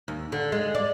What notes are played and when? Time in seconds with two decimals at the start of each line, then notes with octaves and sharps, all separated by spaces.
0.08 D#2
0.32 D3
0.52 G#3
0.75 D5